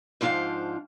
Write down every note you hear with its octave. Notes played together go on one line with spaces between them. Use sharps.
G#2 F3 D4 F4 F5 G5